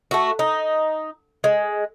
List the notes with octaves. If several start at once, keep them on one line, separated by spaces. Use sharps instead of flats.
A3 F#4
D#4
G#3